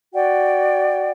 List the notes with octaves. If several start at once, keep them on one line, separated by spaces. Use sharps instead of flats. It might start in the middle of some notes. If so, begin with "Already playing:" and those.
F#4 D5 F#5 G5